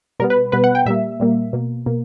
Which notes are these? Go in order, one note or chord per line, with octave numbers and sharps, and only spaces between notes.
B2 G3 B3 A#4
B4
B2 G3 B3 B4
F#5
G5
A#2 G3 A#3 E5
A#2 G3 A#3
B2 A#3
B2 A#3